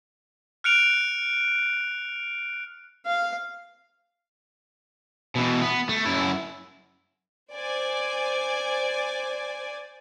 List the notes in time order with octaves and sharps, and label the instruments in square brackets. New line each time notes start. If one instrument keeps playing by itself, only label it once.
[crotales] F6 F#6 C#7 D7 F7
[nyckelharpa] F5
[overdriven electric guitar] B2 E3
B3
A3
F#2 E4
[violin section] C5 D5 G#5